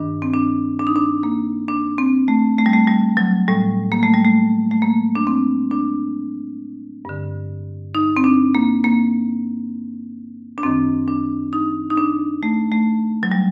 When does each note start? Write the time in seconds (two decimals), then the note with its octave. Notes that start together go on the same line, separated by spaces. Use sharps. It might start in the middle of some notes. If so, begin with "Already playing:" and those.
Already playing: G2 D#3 D4
0.22 C4
0.34 D4
0.79 D4
0.87 D#4
0.96 D4
1.23 A#3
1.68 D4
1.98 C4
2.28 A3
2.59 A3
2.66 G3
2.74 A3
2.87 G3
3.17 F#3
3.48 A2 G3
3.92 A#3
4.03 A3
4.13 G3
4.25 A3
4.71 A3
4.82 A#3
5.15 D4
5.27 C4
5.71 D4
7.05 G2 D3
7.95 D#4
8.17 C4
8.24 D4
8.55 A#3
8.84 A#3
10.58 D4
10.63 F#2 D#3 C4
11.08 D4
11.53 D#4
11.90 D#4
11.97 D4
12.43 A3
12.72 A3
13.23 F#3
13.32 G3